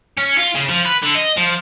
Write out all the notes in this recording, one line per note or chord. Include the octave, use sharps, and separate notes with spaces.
C#4
F4
C#3
F3
B4
D3
D#5
F3